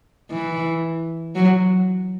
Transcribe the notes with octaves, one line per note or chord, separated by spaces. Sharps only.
E3
F#3